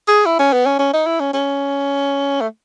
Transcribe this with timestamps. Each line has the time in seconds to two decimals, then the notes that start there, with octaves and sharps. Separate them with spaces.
0.08 G#4
0.26 E4
0.39 C#4
0.53 B3
0.66 C#4
0.79 C#4
0.93 D#4
1.06 E4
1.20 C#4
1.33 C#4
2.41 A3